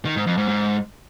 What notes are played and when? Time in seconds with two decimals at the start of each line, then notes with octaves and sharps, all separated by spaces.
0.05 D#3
0.16 G#2
0.27 F2
0.38 G#2
0.48 G#2